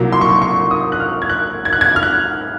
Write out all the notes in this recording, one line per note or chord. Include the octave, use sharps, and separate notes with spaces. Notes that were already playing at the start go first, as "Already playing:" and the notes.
Already playing: C2 A#2 F#3 A#3
C6
C#6
C6
C#6
D#6
F#6
F6
G#6
F#6
G#6
F#6
G#6
F6
F#6